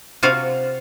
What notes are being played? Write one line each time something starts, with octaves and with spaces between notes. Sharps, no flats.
C3 F4 F#4 F5